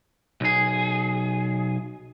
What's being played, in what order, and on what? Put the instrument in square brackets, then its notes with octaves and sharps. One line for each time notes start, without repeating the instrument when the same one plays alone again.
[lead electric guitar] B1 G#4